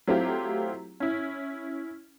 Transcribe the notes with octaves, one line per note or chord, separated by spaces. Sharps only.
F#3 A3 C4 E4 F4 G4
C#4 E4